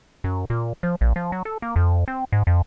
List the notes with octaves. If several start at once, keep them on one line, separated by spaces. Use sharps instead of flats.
F#2
A#2
F3
A#1
F3
F#3
A4
A#3
F2
C4
G#2
F2